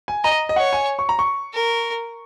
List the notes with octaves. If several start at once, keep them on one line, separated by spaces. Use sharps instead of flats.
G#5
D#5 A#5
D#5
C#5 F#5
G#5
C#6
A#5
C#6
A#4